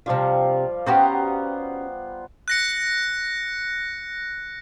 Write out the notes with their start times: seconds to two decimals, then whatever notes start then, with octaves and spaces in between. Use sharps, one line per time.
0.06 C3 F3 G3 D4 F4
0.86 B3 C#4 F#4 G4 C5 A#5
2.48 F#6 A#6 C#7